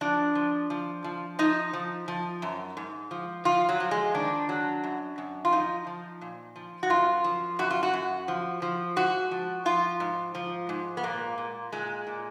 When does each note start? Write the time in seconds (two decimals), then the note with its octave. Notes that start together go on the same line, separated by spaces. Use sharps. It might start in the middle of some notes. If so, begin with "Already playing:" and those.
0.01 F3 D4
0.35 F3
0.70 F3
1.04 F3
1.39 F3 D#4
1.73 F3
2.08 F3
2.42 F#2
2.77 G#2
3.11 F3
3.45 F3 F4
3.69 F#3
3.80 F3
3.91 G#3
4.14 D#3 D4
4.49 F#3
4.84 F#2
5.18 F#2
5.45 F4
5.52 F3 D#4
5.87 F3
6.21 A#2
6.56 F3
6.83 F#4
6.90 F#2 F4
7.24 F3
7.59 F#2 F#4
7.70 F4
7.83 F#4
7.93 F#2
8.28 F3
8.62 F3
8.96 G#2 F#4
9.31 F3
9.65 F3 F4
10.00 G#2
10.35 F3
10.69 G#2
10.97 B3
11.03 A#2 A#3
11.38 A#2
11.72 A#2 G#3
12.07 A#2